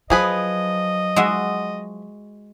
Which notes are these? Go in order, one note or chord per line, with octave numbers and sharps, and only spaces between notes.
F3 F#3 G#4 B4 D#5
G#3 F#4 E5